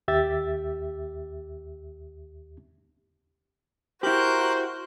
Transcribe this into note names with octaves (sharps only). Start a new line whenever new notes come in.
D#2 G4 E5 E6 A6
E4 F#4 G4 A#4 C5 F#6 G6